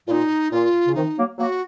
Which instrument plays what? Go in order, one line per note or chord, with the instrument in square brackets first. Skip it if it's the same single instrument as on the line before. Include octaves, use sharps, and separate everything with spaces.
[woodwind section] A#2 [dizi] D#4 F4
[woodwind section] A#2 [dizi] F4
[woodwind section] C#3
[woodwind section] C3 D#3 [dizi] D#4
[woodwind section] F#3 A#3
[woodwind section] F#3 A#3 [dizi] F#4